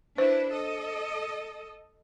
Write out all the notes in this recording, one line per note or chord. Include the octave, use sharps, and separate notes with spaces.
D4 E4 B4 C5
A4 D#5